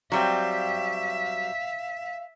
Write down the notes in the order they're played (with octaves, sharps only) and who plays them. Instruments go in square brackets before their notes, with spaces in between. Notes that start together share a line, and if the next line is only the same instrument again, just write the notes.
[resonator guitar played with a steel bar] F#3 G3 C4 [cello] E5 [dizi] F5